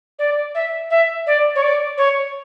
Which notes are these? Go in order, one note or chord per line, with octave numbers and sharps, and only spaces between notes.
D5
E5
E5
D5
C#5
D5
C#5